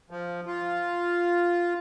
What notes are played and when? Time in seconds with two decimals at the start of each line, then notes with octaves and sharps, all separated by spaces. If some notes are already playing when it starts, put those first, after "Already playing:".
0.10 F3
0.47 F4